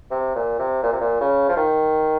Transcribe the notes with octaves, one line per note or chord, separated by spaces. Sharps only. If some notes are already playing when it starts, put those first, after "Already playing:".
C3
A#2
C3
A#2
C3
A#2
C#3
F3
D#3